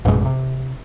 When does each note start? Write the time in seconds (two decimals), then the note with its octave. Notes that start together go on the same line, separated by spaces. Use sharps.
0.05 A1 F#2 B2 G#3
0.25 C3